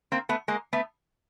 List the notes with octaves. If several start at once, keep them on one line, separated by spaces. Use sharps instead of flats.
A#3 C4
A3 B3
G#3 A#3
A3 B3